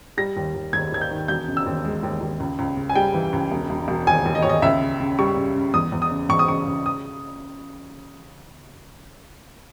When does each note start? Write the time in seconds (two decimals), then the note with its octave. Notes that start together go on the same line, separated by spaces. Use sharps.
0.17 G3 A#6
0.36 D#2
0.55 D#2
0.73 D#2 G#6
0.92 D#2 G#6
1.01 G6
1.11 D#3
1.28 E1 G6
1.48 C#3
1.57 E6
1.66 D#2
1.84 G#3
2.03 D#2
2.21 D#2
2.40 C#2
2.59 C#2
2.77 C#3
2.89 G#5
2.95 G3 G5
3.14 E3
3.33 C#2
3.52 E1
3.70 E1
3.88 E1
4.07 D#2 G#5
4.25 D#2
4.35 D#5
4.42 D#2 C#5
4.49 D#5
4.62 C#2 E5
4.81 C#3
5.00 C#3
5.19 G3 C#6
5.37 C#3
5.56 C#3
5.74 E2 D#6
5.92 E2
6.02 D#6
6.11 C#3
6.29 E2 C#6
6.39 D#6
6.48 C#3 C#6
6.66 C#3
6.86 D#6